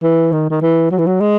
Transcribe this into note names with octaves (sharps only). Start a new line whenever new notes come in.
E3
D#3
D#3
E3
F#3
E3
F#3
G#3